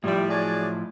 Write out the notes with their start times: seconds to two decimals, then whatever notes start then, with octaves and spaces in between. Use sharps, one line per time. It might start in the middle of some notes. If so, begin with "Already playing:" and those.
0.04 A2 F3 G3 E4
0.29 F#3 G#4 D5